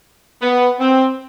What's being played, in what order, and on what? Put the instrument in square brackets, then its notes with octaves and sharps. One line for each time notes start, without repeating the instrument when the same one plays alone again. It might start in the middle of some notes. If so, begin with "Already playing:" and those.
[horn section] B3
C4